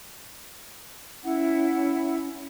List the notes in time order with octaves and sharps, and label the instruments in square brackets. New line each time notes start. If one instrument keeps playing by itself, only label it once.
[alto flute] C#4 [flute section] E4 F#5